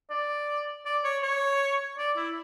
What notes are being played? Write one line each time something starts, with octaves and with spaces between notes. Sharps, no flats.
D5
D5
C#5
C#5
D5
E4